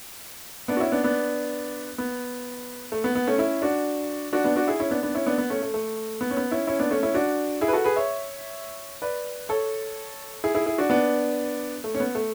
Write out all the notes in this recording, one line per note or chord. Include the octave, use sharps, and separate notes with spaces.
B3 D4
F#4
C#4 E4
B3 D4
B3 D4
B3
A3
B3
B3
A3 C#4
C#4 E4
D4 F#4
D4 F#4
B3 D4
D4 F#4
E4 G#4
C#4 E4
B3 D4
B3 D4
C#4 E4
B3 D4
B3
A3 C#4
A3
A3
B3
C#4
B3
C#4 E4
C#4 E4
B3 D4
A3 C#4
C#4 E4
D4 F#4
E4 G#4
B4
F#4 A4
G#4 B4
C#5 E5
B4 D5
A4 C#5
E4 G#4
E4 G#4
E4 G#4
D4 F#4
B3 D4
A3
C#4
B3
A3